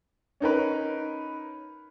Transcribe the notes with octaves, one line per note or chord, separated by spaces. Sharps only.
C#4 D#4 A#4 B4